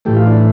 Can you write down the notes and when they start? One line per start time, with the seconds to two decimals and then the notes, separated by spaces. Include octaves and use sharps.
0.05 A2 E3 A3 G4
0.16 F4
0.27 D4